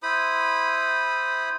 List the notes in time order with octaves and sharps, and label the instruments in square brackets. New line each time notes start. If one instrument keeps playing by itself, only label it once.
[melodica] E4 C5 B5 D#6